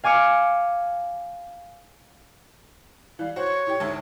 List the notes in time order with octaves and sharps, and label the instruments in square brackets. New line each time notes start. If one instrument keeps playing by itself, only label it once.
[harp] F5 G#5 D6 F6 C#7
[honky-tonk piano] E3 G3 [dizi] F5
[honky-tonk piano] F#4 C5 [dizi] C#5
[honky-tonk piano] A2 G4
G#1 D2 E5